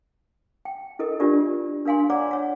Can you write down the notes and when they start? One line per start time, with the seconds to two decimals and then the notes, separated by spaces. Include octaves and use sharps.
0.65 G5
0.99 E4 A4 A#4 D#5
1.20 D4 F4 G4 A#4 D5
1.85 D4 A#4 F5 G#5 C6
2.10 C#5 D5 F#5 A#5 D6
2.31 C#5 F#5